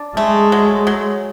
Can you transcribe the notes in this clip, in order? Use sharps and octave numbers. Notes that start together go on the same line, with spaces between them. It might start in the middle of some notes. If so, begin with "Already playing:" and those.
Already playing: D4
G#3 A3
F#3
F#3